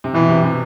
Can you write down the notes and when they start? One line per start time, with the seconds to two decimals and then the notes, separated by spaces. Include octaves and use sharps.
0.04 C3
0.14 B2 E3
0.29 C3
0.44 C3